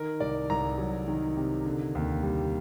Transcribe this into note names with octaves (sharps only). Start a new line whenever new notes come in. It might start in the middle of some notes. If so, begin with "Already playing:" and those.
Already playing: D#3 A#4
C2 D5
C2 A#5
F#3
D#3
C3
D3
D#2
G3